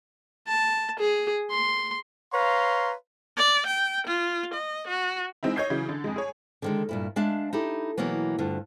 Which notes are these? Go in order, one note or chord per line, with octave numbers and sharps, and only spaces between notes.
A5
G#4
C6
B4 C#5 F5 A#5 C6
D5
G5
F4
D#5
F#4
G#3 C4 D#4 E4
C#5 D#5 G6 G#6 C7
C#3 E3 F#3
D3
F2 G#3
G#4 C#5
D3 D#3 G#3
G2 A#2 E4
G#3 D4 E5 F5 A5
D#4 E4 G4 A4
B2 E3 F#3 A#3 B3
D2 G2 D3 F4